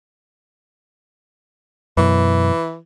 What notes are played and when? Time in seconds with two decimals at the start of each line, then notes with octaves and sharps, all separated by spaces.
1.97 F#2 B2 E3